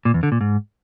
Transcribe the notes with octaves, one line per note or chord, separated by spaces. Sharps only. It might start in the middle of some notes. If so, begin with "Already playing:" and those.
A#2
E2
D3
A#2
G#2